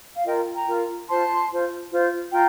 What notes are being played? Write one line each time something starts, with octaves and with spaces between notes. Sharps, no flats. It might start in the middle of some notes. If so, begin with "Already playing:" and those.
F5
F4 A#4 D#5 G5
G5 A#5
F4 A#4
F4 C5 A5 C6
F4 C5
F4 C5
F4 G5 A#5